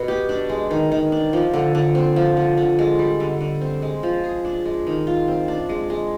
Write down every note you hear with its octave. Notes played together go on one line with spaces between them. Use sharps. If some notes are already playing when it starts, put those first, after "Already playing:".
Already playing: B2 B3
G4
D4
G#3
D#3
D#3
D4
F3
D3
D3
C4
F3
D3
D3
G#3
G3
D3
D3
C4
G#3
F3
G#4
D4
G#3
D#3
F4
C4
D4
G#3
G#3